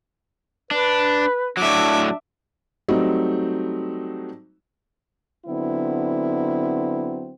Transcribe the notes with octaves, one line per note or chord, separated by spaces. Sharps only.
D4 B4
A2 F#3 D4 E5 D6
F#3 G3 A3 C4 D#4
D3 F#3 B3 C4 E4